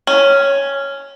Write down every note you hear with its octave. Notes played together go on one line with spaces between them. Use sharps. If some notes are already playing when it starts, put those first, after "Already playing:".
C#4